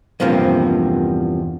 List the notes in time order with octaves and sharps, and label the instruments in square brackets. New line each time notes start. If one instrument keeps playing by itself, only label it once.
[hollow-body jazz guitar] E2 G2 C3 F3 A#3